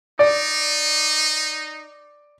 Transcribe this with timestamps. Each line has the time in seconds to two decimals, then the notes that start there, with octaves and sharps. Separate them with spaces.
0.19 D#4 D5